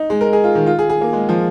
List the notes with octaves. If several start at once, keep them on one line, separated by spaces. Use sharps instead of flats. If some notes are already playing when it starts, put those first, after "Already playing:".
Already playing: D#4
G#3
A#4
G#4
F4
D#3
F4
G#4
G#4
A#3
G#3
F3